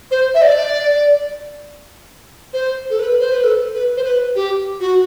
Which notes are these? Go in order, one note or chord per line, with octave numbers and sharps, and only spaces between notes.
C5
E5
D5
C5
A4
B4
C5
B4
A4
B4
C5
B4
G4
F#4